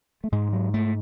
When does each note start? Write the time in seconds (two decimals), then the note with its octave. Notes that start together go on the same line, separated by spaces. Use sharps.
0.24 A3
0.32 G#2 G#3
0.53 F#3
0.74 A3